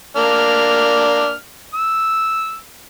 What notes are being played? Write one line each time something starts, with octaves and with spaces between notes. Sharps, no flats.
A#3 D4 F6
E6